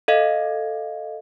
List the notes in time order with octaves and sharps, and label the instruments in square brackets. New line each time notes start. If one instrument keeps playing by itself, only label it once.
[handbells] A4 D#5 F5